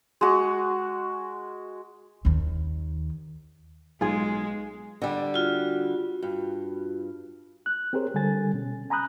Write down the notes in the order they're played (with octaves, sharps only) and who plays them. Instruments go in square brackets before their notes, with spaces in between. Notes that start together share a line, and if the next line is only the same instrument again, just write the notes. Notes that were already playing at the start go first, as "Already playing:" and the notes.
[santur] G#3 F#4
[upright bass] D#2 D#3
[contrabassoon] B1 [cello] G#3 [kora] F4 G#4 [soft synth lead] G#5
[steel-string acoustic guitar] D3 G3
[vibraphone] F4 F#4
[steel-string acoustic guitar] G2
[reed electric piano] F#6
C4 G4 G#4 A#4 C5 C#5
D3 G3 A4 G#5 A6
B2 C#4
G#5 A#5 B5 D#6 F#6 G6